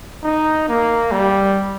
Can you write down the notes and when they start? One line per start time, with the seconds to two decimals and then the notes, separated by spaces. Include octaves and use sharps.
0.23 D#4
0.69 A#3
1.12 G3